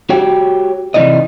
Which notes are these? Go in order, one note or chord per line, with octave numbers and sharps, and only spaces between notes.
F#4 G4 C#5 G5
C3 E3 A3 D#4 D5 D#5